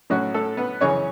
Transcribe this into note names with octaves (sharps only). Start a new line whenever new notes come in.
A2 F#3 C#4 F#4
A3 A4
B3 B4
F#2 C#3 E3 C#4 C#5